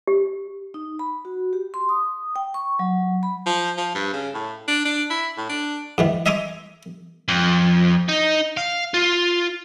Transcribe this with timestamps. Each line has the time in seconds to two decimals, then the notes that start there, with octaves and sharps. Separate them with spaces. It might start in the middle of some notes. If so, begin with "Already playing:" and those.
0.07 G4
0.74 D#4
0.99 B5
1.25 F#4
1.53 G4
1.74 C6
1.89 D#6
2.36 G5
2.54 C#6
2.79 F#3
3.23 B5
3.46 F3
3.77 F3
3.95 G2
4.13 C#3
4.34 A2
4.67 D4
4.85 D4
5.10 E4
5.37 A2
5.49 D4
5.98 G#2 D#3 E3
6.26 D#5 E5 G#5 A#5 C6 D6
7.28 F2
8.09 D#4
8.57 F5
8.94 F4